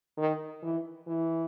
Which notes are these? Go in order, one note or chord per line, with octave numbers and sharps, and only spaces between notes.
D#3
E3
E3